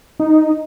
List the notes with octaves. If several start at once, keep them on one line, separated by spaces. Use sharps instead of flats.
D#4